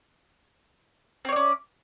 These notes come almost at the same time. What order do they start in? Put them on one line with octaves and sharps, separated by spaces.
C4 C#5 D5 C#4